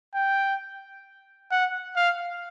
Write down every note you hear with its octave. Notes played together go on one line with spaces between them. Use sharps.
G5
F#5
F5